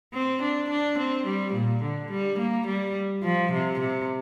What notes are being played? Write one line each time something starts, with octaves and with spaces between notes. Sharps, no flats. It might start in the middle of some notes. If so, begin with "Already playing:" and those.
C4
D4
D4
C4
G3
A#2
D3
G3
A#3
G3
F3
C3
C3